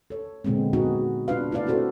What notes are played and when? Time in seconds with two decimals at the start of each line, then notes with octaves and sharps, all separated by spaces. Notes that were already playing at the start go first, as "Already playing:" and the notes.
0.10 A4 C#5
0.44 A#2 D3 G#3 B3 C4
0.73 B3 D#4 F#4 G#4
1.28 B3 C4 D4 F4 B4 F5
1.52 A3 E4 F4 B4 D5 F5
1.66 C4 D4 E4 F#4 A4 C5